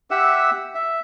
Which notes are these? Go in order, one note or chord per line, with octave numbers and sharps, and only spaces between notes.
G4 E5 F#5 E6
E5